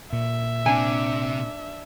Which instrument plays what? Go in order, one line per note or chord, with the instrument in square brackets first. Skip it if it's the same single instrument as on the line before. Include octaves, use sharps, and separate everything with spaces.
[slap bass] A#2 [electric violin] E5
[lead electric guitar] C3 [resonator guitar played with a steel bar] D4 G#5